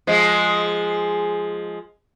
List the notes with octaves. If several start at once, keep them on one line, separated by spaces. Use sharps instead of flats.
F3 G#3